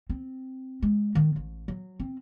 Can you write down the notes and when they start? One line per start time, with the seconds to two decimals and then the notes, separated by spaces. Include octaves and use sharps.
0.10 C4
0.82 G#3
1.15 D#3
1.36 A1
1.68 F#3
2.00 C4